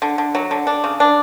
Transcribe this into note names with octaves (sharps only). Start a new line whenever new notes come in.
D3
D3
F#3
D3
D4
C#3
D4